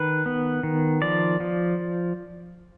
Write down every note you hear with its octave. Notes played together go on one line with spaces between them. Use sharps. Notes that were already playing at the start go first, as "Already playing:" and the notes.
Already playing: D#3 B4
B3
D#3
F3 D5
F3